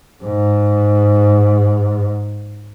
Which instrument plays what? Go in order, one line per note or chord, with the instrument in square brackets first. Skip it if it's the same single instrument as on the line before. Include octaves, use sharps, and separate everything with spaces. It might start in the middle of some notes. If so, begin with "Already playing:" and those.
[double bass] G#2